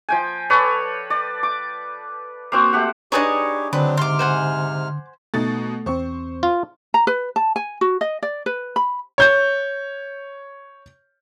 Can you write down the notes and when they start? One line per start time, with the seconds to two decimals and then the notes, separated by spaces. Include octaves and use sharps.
0.09 F3 G5 G#5
0.50 A4 B4 C#5 D5
1.10 D5
1.43 D6
2.52 A#3 C4 F#4
2.73 A3 G4 F#5
3.12 D4 D#4 G4 G#4 B4 C#5 D#5
3.73 D3 F#3 C4 D4 B4
3.97 G#2 C3 C6 D6 F6
4.19 C5 F#5 G#5
5.34 B2 A3 D#4 A6
5.86 E2 C4 C5 C#6
6.43 F4
6.94 A#5
7.07 B4
7.36 A5
7.56 G#5
7.81 F#4
8.01 D#5
8.23 D5
8.46 B4
8.76 B5
9.18 C#5 G6